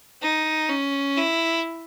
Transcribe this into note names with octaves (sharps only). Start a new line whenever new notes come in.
D#4
C#4
E4